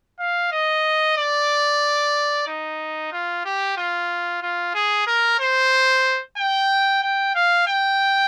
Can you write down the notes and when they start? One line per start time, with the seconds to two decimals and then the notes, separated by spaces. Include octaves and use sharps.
0.19 F5
0.52 D#5
1.17 D5
2.47 D#4
3.12 F4
3.45 G4
3.77 F4
4.42 F4
4.74 G#4
5.07 A#4
5.40 C5
6.37 G5
7.02 G5
7.35 F5
7.67 G5